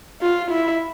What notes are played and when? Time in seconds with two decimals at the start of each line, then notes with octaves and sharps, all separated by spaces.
0.22 F4
0.51 E4